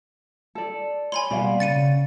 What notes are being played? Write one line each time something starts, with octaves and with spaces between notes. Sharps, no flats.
A4 D5
C#5 G#5 B5 C6
B2 G3 A#3 D5 F5 F#5
C#3 A6 C#7 D#7